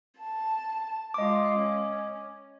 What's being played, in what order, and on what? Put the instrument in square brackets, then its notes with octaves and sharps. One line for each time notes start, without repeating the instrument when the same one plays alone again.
[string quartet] A5
[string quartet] G#3 F4 [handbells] D#5 D6
[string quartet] C#4